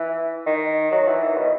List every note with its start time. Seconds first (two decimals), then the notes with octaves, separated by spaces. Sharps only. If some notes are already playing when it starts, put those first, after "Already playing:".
Already playing: E3
0.46 D#3
0.92 F#3
1.08 E3
1.23 D#3
1.37 B2